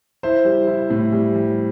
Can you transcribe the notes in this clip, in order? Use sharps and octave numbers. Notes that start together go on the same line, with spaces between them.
E4 C5
G3
E4
A2
G3
G3